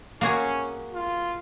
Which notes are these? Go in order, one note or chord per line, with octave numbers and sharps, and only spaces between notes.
A#3 C#4 F#4 G#4
F4